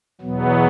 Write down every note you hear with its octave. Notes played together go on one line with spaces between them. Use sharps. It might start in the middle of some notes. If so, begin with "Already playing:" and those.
E2 B2 F#3 B3